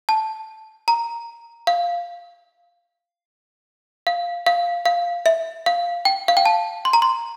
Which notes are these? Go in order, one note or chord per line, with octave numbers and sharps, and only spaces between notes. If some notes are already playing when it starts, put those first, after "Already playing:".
A5
A#5
F5
F5
F5
F5
E5
F5
G5
F5
G5
A5
C6
A#5
C6